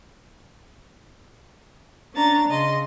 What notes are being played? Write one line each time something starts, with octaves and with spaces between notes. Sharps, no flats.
C#4 D4 A#5 A6
C#3 D#5 C6